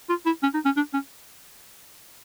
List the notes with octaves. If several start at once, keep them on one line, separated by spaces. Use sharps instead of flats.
F4
E4
C#4
D#4
C#4
D4
C#4